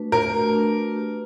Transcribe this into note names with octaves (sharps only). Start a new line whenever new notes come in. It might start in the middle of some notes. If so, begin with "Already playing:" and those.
Already playing: A3 D4 F#4 B4
F#4 A#4
A3
D4
B4
G4